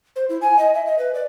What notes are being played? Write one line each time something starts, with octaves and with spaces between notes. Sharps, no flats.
C5
E4
G#5
D#5
E5
D#5
B4
D5